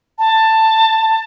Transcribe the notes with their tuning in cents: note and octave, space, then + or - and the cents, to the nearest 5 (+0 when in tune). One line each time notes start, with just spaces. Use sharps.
A5 +15